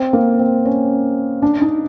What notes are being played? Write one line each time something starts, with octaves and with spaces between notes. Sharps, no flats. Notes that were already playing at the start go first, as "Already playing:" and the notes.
Already playing: C4
A#3
C4
C#4
D4
D#4